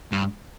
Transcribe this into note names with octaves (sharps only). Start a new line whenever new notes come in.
G2